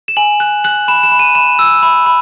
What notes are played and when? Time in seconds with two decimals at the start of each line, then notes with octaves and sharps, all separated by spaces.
0.08 E7
0.17 G#5 F#7
0.40 F#6
0.64 F#6 F#7
0.88 B5 E7
1.03 E7
1.12 B5
1.19 D#7
1.35 B5 E7
1.59 E6
1.83 B5
2.06 B5